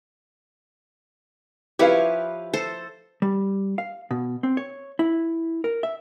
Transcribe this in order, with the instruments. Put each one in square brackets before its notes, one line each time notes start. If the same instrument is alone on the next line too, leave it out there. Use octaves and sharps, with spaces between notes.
[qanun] F3 E4 C#5 [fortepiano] G4 B4 F5
[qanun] A4 C5
[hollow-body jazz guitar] G3
F5
B2
C4
C#5
E4
A#4
E5